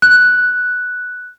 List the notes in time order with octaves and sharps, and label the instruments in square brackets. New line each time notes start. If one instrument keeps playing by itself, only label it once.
[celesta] F#6